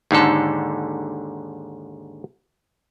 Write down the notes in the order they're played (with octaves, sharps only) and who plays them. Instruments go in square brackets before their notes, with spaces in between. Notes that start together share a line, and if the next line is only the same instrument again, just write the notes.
[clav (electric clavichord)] D#2 G#2 D3 A4